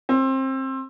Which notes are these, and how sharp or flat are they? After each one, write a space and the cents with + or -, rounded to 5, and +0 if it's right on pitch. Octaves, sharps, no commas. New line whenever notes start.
C4 +25